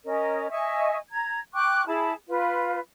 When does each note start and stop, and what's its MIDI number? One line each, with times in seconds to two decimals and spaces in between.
0.05 0.50 61
0.05 0.50 70
0.05 0.50 75
0.50 0.97 75
0.50 0.97 76
0.50 0.97 80
0.50 0.97 85
1.09 1.39 82
1.09 1.39 92
1.54 1.85 79
1.54 1.85 85
1.54 1.85 86
1.54 1.85 90
1.86 2.13 64
1.86 2.13 68
1.86 2.13 81
1.86 2.13 83
2.28 2.80 65
2.28 2.80 71